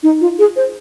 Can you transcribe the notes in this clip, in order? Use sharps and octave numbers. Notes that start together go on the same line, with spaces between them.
D#4
F4
G#4
C5